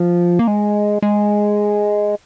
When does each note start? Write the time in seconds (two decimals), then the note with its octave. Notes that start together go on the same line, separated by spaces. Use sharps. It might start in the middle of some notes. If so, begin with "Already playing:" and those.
Already playing: F3
0.39 A#3
0.48 G#3
1.02 G#3